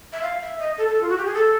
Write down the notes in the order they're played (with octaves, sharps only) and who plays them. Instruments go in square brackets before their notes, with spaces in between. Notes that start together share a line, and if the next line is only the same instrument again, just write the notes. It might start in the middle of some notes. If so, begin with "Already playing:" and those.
[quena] E5
F5
E5
D#5
A4
A4
F4
F#4
G4
G#4
A4